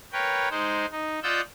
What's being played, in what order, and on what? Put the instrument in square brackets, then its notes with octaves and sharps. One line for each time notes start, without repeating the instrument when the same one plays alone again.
[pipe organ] A#4 B4 C#5 G5
G#3 D#4 C5
D#4
F4 D5 D#5 F#5 E6 G6